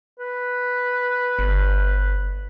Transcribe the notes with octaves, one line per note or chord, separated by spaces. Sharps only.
B4
G1